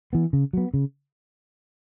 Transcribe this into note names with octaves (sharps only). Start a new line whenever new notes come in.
E3 B3
C#3
F#3 B3
C#3